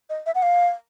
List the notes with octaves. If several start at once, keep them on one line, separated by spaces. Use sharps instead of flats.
D#5
E5
F#5
F5